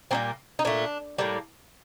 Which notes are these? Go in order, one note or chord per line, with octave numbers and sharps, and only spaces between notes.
A#2 G3 A#3 C4
D#4
A#2 A3 D4
A2 G3 A#3